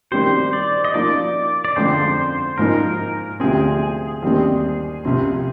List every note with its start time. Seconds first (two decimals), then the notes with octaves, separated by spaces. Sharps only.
0.11 D#3 G3 C4 G4 C5
0.53 D5
0.85 D#5
0.94 F3 A#3 D#4 D5
1.65 D5
1.76 F2 D3 G#3 C4 C5
2.58 G#2 F3 A#3 D#4 A#4
3.40 D2 C3 F3 C4 G#4
4.22 D#2 D#3 G3 C4
5.05 C2 C3 F3 C4